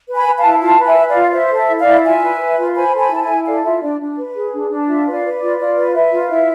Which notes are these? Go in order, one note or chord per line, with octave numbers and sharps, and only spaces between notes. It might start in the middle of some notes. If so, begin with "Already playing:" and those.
B4
G#5 B5
B4
F5 A5
E4
F4 F5 A5
B4
E5 G#5
B4
D5 F5
F4
C5 E5
A4
E5
E4
D5 F5
E4
F4 E5 G#5
B4
B4
F4
C6
C5 G#5 B5
A4
G#5 B5
E4 A5
E5 G#5
E4
A4 D5 F5
F4 E5
D4 D5
D4
B4
G#4
D4
D4
F4 E5
B4
D5 F5
B4
D5
F4
F4 D5
B4
B4 E5
F4
E4 E5